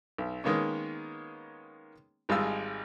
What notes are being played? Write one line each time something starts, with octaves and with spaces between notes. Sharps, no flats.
B1
D#3 G#3 A#3 B3 C#4
G#1 G3 G#3 F4 G#4 E6